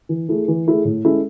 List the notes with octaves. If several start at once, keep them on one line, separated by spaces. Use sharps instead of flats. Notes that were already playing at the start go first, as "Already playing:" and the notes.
E3
A3 E4 G#4
E3
A3 E4 G#4
A2
G#3 C#4 E4 A4